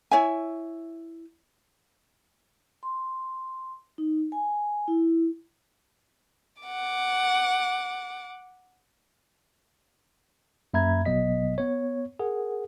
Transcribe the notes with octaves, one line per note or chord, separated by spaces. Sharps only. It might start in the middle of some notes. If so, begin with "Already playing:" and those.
E4 C#5 E5 G#5
C6
D#4
G#5
E4
F#5 D6
F#2 A#3 E5 A#5 B5 G#6
G#1 B2 F#3 B3 D#5 B6
B3 C#5
G#4 A#4 F#5